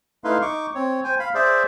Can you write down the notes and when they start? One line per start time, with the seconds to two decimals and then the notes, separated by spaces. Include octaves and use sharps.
0.24 A3 D#4 E4 B4 F5 C6
0.42 D#4 C#6 D6
0.75 C4 C#5
1.04 C5 G5 G#5
1.19 F5 B5
1.35 G#4 C5 D5 E5